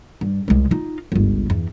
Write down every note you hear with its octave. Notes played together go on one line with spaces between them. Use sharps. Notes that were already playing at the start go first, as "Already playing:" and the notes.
G2
C2 G#3
D#4 F4
G1 C#2
E2